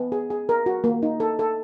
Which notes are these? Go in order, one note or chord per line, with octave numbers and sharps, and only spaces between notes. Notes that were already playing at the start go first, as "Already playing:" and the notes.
Already playing: B3
G#4
G#4
A#4
F#4
A#3
D#4
A4
A4